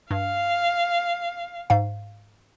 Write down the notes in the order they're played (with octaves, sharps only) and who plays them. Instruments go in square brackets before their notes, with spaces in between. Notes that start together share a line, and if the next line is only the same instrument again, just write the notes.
[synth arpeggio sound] G2 [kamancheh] F5
[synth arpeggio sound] G#2 F5